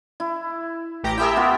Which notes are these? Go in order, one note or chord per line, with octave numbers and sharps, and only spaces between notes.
E4
A1 G4 A#5
E4 G4 G#4 A#4 E5 G5
B3 F4